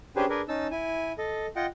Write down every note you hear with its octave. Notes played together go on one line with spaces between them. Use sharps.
C#4 D4 G4 G#4 B4 C5
D4 G#4 A#4 B4
C#4 D#4 A5 E6
E4 G#5
A4 D#5
F4 D#5 F#5 G5